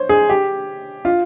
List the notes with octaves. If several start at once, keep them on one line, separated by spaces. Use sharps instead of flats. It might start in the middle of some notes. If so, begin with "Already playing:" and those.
Already playing: C5 C#5
G#4
G4
F4